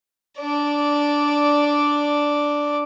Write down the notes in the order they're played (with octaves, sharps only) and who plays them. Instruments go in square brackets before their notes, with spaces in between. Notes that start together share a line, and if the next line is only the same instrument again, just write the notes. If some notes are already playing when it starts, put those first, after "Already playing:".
[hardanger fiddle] D4 D5